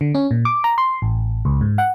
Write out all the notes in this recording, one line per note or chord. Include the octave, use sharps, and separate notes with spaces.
D3
C#4
A#2
D6
A#5
C6
A1
C#2
G#2
F#5